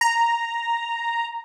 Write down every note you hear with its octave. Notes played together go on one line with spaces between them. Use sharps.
A#5